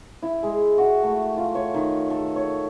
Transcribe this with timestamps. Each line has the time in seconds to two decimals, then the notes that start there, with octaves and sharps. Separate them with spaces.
0.23 E4
0.43 G#3
0.78 F#4
1.03 A3
1.37 F4
1.55 C#5
1.74 D#3
2.10 A4
2.36 C#5